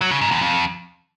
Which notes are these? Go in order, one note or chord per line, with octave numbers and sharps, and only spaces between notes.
F#3
C#3
G#2
E2
F2